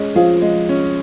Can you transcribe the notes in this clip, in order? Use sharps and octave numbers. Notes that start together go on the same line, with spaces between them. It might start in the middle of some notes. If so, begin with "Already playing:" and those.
Already playing: G#3 C#4
F3 F4 G#4
G#3
C#4